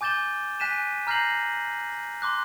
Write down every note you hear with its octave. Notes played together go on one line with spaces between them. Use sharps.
G#5 D6 G6 A6 E7 G7
G#5 F#6 B6 D#7 E7
A#5 F6 G6 A#6 C7 F#7
C6 D6 F#6